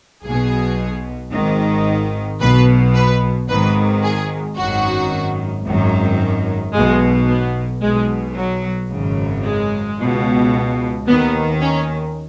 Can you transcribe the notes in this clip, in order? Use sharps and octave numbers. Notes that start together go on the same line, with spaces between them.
B1 B2 G#4
G#1 G#2 D#3
B1 B2 B4
B4
G#1 G#2 D#3 B4
G#4
G#1 F#2 D#3 F#4
G#1 F#2 D#3
B1 B2 G#3
B3
B1 B2 G#3
F#3
G#1 F#2 C#3
G#3
C#2 B2
D#2 D#3 B3
C#4